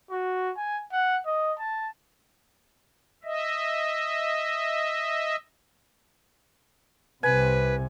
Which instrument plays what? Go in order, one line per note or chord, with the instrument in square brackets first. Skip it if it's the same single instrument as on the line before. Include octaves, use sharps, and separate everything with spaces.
[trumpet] F#4
G#5
F#5
D#5
A5
[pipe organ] D#5 E5
[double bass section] C2 C3 [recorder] B4 [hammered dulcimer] G#5